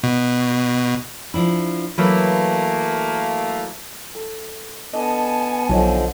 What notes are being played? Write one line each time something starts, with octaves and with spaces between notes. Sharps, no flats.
B2
F3 D4 E4
E3 F#3 A3 A#3 B4
A4
B3 D4 A4 D#5 G#5 A5
B1 D3 F3 F4 C#5 D#5